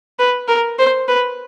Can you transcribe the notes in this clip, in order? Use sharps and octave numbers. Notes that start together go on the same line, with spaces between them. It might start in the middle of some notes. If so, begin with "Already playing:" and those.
B4
A#4
C5
B4